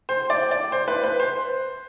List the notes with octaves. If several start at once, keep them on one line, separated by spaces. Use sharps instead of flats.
C5
D5
D5
C5
B4
B4
C5